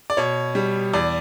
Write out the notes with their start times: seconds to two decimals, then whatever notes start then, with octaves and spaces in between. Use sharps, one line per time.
0.10 D5
0.17 B2 C#5
0.55 G3
0.93 E2 D5